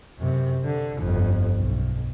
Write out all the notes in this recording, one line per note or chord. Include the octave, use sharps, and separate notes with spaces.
F#2 C3
D3
G1 F2
B1